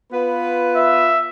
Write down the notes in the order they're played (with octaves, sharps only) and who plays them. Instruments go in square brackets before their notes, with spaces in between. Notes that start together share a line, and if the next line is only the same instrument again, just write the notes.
[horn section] B3 F4 B4
[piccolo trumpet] E5